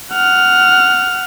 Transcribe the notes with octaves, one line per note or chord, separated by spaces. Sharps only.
F#5 F6